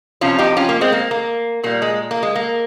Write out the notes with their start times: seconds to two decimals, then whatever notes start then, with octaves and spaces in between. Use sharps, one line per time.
0.21 F2 C3 F3 C#4 F4
0.39 D#4 G4
0.57 C#4 F4
0.69 A#3
0.81 G#3 C4
0.92 A#3
1.11 A#3
1.63 A#2 G3 A#3
1.82 G#3
2.11 A#3
2.23 G#3
2.35 A#3